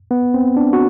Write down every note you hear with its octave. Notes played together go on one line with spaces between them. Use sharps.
B3
C4
D4
F#4